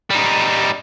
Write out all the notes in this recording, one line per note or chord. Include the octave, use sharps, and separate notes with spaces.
G3 D#4